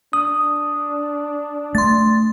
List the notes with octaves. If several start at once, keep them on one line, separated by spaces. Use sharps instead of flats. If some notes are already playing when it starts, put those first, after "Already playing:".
D4 D#6
A3 C6 A6